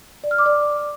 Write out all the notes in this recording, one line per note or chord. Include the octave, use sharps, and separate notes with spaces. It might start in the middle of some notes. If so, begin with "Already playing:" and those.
D5
F6
D6
D5